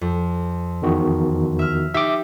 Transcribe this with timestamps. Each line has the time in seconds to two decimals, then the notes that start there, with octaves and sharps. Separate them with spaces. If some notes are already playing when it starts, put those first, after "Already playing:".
0.01 F2
0.82 E2 D#3 F#4
1.59 E5 F6
1.94 D#4 G4 E5 G5 D6